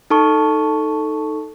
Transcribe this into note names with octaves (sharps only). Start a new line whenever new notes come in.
D#4 A4 A5 C#6